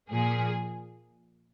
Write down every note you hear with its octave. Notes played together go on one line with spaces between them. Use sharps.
A#2 F3 A#3 G#4